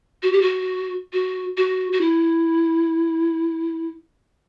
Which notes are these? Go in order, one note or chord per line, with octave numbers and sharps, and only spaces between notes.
F#4
G4
F#4
F#4
F#4
F#4
E4